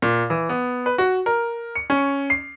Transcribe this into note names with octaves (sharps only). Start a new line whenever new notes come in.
A#2
E3
B3
B4
F#4
A#4
C#7
C#4
C7